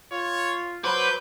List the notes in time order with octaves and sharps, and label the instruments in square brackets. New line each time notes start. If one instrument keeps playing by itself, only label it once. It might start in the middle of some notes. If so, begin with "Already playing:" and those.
[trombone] F4 [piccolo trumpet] C#5
[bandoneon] F#3 C5 D6 [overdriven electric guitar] B4 [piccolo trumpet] G6